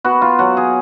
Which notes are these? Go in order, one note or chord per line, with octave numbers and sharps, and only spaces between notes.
B3 F#4
F4
F#3 F#4
G#4